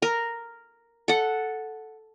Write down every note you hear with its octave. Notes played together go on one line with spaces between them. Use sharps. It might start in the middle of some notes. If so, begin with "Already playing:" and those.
A#4
A4 F#5